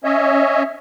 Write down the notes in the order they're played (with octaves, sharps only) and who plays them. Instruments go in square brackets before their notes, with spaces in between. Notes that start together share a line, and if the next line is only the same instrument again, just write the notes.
[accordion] C#4 C#5 D#5 E5